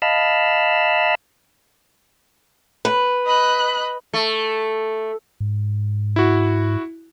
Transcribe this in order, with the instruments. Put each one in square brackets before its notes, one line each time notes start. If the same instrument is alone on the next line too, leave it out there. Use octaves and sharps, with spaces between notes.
[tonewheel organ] D#5 F5 A5 B5 E6 F6
[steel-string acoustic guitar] B4
[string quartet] D#5 B5 F#6
[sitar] A3
[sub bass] G#2
[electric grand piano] E4 F#4